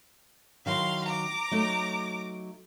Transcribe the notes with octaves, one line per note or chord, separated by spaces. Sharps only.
D#3 F#3 E4 F5 C6
A#5 D6
F#3 A3 D#4